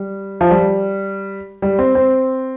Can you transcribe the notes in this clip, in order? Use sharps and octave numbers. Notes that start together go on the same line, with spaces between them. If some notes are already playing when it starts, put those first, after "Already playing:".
Already playing: G3
F3
G3
G3
C4
C4